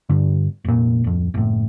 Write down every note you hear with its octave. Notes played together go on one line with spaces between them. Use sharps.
G2 D3
F1 A#2
D1 F2
F#1 A2